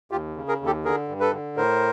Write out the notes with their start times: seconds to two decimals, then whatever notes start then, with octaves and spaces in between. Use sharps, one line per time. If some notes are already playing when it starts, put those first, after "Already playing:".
0.11 D#2 F4 G4
0.37 C#3
0.48 G#4 A#4
0.60 D#2
0.66 G4 A4
0.84 D3 G#4 A#4
1.08 G2
1.20 A4 B4
1.33 D3
1.57 A2 A#4 C5